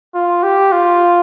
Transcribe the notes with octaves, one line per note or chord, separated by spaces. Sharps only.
F4
G4
F4